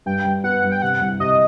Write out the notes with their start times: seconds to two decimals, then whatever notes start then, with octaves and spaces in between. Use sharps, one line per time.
0.06 G2 G5
0.25 G2
0.44 B3 F#5
0.63 G2
0.72 G5
0.82 C3 F#5
1.01 C2
1.20 C3 D#5